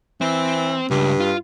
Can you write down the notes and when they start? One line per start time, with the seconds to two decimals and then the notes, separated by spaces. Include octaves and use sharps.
0.21 E3 C4
0.91 C#2 G2
1.20 F4